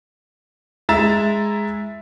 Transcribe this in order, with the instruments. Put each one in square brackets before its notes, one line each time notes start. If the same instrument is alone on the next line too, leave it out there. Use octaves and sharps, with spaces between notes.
[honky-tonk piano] G#3 E4 E5 A#5 A6 E7